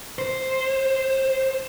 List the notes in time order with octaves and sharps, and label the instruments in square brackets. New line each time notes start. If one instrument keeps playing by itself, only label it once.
[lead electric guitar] C5